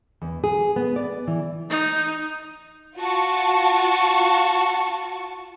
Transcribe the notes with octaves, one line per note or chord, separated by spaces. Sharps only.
E2
G#4
B3
D5
E3
D#4
F4 F#4 A5 C#6